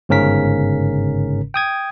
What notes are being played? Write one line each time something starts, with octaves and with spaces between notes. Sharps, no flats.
G1 G#2 C#3 C#4 A#4 B6
G5 D#6 G#6